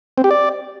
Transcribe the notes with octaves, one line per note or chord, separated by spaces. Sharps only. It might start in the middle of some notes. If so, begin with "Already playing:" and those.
C4
G4
D5